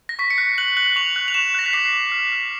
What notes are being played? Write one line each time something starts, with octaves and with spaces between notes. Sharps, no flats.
A#6
C#6 B6
C#7
F#6 C7
F#6 F#7
F#6 F#7
C#6 F7
F#6
F7
C#6 E7
F#6 A#6
B6
D6 C7
D6
F6
F6